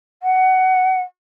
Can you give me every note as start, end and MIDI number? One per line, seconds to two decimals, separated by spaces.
0.23 1.01 78